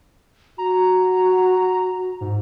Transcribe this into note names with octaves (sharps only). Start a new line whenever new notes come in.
F#4 A#5
G#2